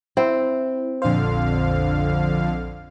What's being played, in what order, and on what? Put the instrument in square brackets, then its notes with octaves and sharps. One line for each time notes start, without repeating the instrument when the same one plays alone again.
[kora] C4 [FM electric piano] E4
[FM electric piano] A#1 C5 [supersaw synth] F2 D3 F5